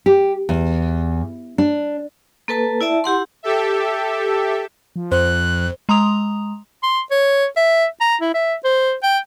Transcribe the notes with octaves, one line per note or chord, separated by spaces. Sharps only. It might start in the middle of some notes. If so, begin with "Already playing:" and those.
G4
E2
D4
A#3 A4 B4 A5
E4 D5 E5 A5
E4 G4 F#5 C6
G4 A4 E5
F3
F2 C5 F#6
G#3 A#5 C6 D#6 F7
C6
C#5
E5
A#5
E4
E5
C5
G5